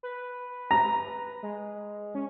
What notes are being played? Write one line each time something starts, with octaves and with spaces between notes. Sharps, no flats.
B4
A#5
G#3
C#4